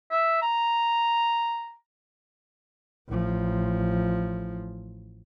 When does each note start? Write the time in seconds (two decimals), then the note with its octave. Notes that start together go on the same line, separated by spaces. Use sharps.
0.11 E5
0.42 A#5
3.08 A1 F3